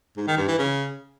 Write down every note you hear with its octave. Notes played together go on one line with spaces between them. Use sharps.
G#2
D#3
G2
E3
C#3